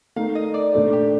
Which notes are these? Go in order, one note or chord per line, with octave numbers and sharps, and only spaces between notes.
A3 D#4 A#4 F5
D#5
D5
A#2 A3 D4 A4 C5
G4